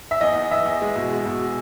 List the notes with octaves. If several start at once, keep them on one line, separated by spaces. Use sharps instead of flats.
E5
E2 D#5
E2
E2 E5
E2
G#3
B2
G#3
B2